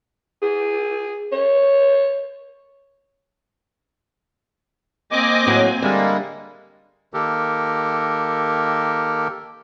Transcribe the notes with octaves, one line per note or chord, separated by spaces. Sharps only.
G#4
C#5
A#3 C4 D#5 G#5 D6
A2 F#3
D3 G3 G#3 A#3 E5
D#3 A#3 G4 A4 A#4